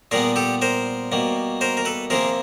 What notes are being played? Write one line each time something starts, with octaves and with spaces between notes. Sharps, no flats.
A#2 G3 B3 G#4 A#4
G4 A4
A#4 C5
B2 G3 A#3
A#4 C5
A#4
A4 B4
C3 F3 A#3 G#4 A#4